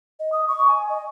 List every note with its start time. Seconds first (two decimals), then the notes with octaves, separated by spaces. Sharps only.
0.20 D#5
0.32 D#6
0.48 C#6
0.68 G#5
0.89 D#5